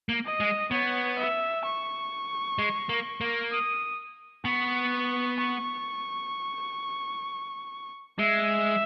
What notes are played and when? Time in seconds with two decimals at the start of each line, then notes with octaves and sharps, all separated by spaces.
0.09 A#3
0.25 D#5
0.40 G#3
0.71 B3 C#5
1.18 E5
1.64 C#6
2.58 G#3
2.89 A#3
3.21 A#3
3.51 D#6
4.44 B3 C#6
5.39 C#6
8.19 G#3 E5